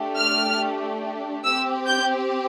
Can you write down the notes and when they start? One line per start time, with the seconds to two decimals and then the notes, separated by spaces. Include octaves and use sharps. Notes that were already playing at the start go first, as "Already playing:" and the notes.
Already playing: A3 D4 G4
0.17 F6
1.44 C4 G4 E6
1.87 G6